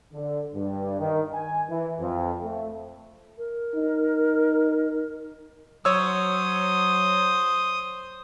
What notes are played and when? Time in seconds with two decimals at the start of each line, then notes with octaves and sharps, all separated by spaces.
0.13 D3
0.55 G2
1.00 D#3
1.34 G#5
1.69 E3
2.01 F2
2.44 A3
3.38 A#4
3.75 D#4
5.85 F#3 C5 C#5 D#6 E6